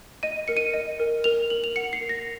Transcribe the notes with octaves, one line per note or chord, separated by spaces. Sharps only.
D#5 D#7
A#4 C#7
D#7
D#5
A#4
A#4 F7
A#4 F#7
F7
F#5 C#7
C7
A#4
A#6